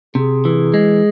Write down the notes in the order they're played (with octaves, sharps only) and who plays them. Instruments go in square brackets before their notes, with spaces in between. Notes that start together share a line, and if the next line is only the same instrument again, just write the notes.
[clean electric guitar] C3 [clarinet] G#4
[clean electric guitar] E3
G#3